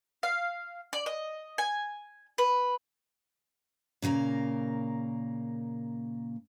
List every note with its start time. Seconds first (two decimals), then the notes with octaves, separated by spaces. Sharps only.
0.23 F5
0.93 D5
1.06 D#5
1.58 G#5
2.38 B4
4.02 A#2 C#3 A#3 A#4